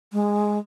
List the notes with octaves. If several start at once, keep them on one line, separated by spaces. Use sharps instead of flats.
G#3